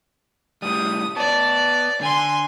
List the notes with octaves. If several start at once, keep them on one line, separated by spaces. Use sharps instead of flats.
A2 G3 D#6
B3 D5 A5
D3 G#5 C6